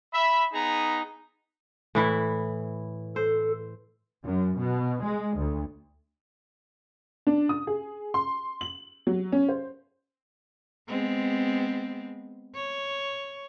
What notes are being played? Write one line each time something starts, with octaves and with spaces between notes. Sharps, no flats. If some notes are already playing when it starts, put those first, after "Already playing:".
E5 B5
B3 D#4 G#4 A#5
A2 E3 E4
A4 C5
F#2
B2
G#3
D2
D4
D#6
G#4
C6
F#7
F#3
C#4
C5
G#3 B3 C4
C#5